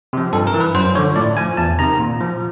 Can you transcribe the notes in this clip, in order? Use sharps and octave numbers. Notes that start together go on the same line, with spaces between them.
C3 F3
G2 A4
A#4
E3
B4
F#2 C5
D3 F3 C#5
A2 D5
F3 G#5
E2 A5
C3 D#3 A#5
A#2
F3